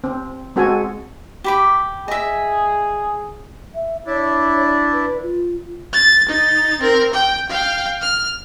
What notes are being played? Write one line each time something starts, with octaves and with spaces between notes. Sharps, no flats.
C4
G#3 C4 F#4 A4 G#5
G4 B5 D6
G#4 D#5 E5
E5
D4 E4 C#5 D5
B4
F4
A6
D#4 A6
C4 A#4
G5
F5 G5
F6